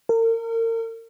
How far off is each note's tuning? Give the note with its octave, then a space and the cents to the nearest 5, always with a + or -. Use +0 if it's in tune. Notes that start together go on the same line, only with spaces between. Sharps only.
A#4 -35